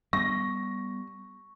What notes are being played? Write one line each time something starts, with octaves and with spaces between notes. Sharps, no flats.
G3 B3 C#6 A#6